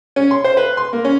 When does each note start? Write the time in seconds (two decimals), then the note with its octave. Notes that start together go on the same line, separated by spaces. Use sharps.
0.16 C#4
0.31 C6
0.44 C5
0.57 B4
0.77 C6
0.93 A#3
1.05 C#4